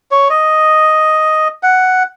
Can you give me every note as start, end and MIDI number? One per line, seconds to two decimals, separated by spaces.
0.11 0.28 73
0.30 1.48 75
1.63 2.03 78